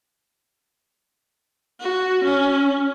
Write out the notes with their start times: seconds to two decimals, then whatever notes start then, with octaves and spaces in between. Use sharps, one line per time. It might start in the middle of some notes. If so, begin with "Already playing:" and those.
1.80 F#4
2.24 C#4